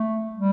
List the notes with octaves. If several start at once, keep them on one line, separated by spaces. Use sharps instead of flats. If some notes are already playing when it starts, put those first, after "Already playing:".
Already playing: A3
G3